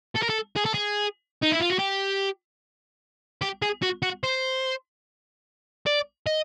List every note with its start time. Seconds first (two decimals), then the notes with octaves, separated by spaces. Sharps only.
0.16 A4
0.23 A#4
0.30 A4
0.56 G#4
0.65 A4
0.74 G#4
1.42 D#4
1.52 E4
1.61 F4
1.70 F#4
1.79 G4
3.42 G4
3.62 G#4
3.82 F#4
4.03 F#4
4.24 C5
5.86 D5
6.27 D#5